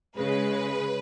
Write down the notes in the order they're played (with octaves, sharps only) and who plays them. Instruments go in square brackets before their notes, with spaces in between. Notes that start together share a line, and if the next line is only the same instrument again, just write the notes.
[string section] C#3 G#3 B4